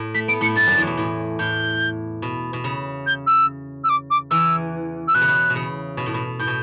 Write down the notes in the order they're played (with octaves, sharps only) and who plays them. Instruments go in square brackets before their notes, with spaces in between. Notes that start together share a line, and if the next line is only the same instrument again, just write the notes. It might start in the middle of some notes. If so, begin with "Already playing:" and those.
Already playing: [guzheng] A2
[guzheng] A3 [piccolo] B6
[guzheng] B3 [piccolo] D7
[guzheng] A2 A3 [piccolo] C#7
[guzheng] G2 G3 [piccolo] A6
[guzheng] F#2 D3 F#3
E2 E3
B2
A2
[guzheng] A2 [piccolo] G6
[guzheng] B2
B2
C#3
[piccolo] G6
E6
E6
D6
D6
[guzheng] E2 E3 [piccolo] E6
[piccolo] E6
[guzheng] B2 [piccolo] F#6
[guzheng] C#3
B2
B2
C#3
B2
A2
B2
[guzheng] A2 [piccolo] G6
[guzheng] B2